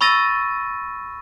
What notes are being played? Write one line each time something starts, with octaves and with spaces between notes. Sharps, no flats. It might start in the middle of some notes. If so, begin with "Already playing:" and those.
B5 C#6 E6 A6 A#6 D#7